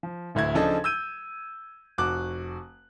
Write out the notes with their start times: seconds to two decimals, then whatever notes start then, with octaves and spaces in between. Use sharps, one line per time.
0.03 F3
0.35 D1 D2 E4 G#6
0.54 C#3 F3 D4 D#4 A4 D#5
0.84 E6 G6 D#7
1.98 F1 F#4 D6 F#6